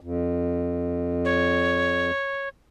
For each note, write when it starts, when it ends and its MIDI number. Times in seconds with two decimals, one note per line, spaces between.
0.01 2.11 41
1.25 2.49 73